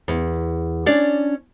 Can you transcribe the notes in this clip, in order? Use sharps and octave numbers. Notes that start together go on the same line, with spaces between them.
E2
C#4 D4 D5